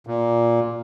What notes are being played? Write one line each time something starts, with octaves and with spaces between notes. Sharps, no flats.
A#2